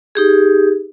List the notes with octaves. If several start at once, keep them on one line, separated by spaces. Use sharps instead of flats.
D#4 G4 G#4